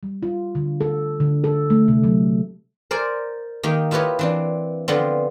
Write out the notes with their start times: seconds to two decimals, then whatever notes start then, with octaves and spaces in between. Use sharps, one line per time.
0.03 G3
0.23 F4
0.55 D3
0.81 A4
1.20 D3
1.44 A4
1.70 A3
1.88 C3
2.04 F#3
2.91 A#4 C5 D5 G#5
3.63 D#3 A#3 G4 D#5
3.91 E4 F4 G4 B4 C#5 D#5
4.19 E3 C4 D4
4.88 D3 F3 B3 C4